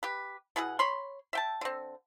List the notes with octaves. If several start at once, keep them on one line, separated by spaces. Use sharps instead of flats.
G4 B4
B2 E4 G#4 F#5
C#5 B5 C6
E5 G5 A5
D3 C4